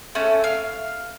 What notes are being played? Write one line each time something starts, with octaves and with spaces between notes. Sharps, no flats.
A3 C#4
F5